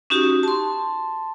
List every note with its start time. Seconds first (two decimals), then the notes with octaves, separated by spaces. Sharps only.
0.10 C#4 D#4 F#4 G4
0.43 A5 C6